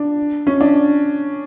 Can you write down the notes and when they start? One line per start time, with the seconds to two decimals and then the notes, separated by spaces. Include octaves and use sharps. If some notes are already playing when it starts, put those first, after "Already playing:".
Already playing: D4
0.47 C#4
0.61 D4